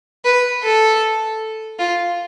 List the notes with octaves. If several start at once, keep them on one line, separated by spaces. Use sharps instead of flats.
B4
A4
F4